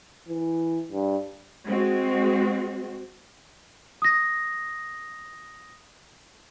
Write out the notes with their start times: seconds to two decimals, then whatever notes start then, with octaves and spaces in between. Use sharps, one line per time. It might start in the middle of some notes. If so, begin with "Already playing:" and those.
0.28 E3
0.92 G2
1.65 G#3 C4 F#4
4.02 D#6 A#6